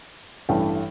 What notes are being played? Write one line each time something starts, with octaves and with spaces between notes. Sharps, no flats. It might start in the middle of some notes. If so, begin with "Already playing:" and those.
A1 G2 E3 A3 G5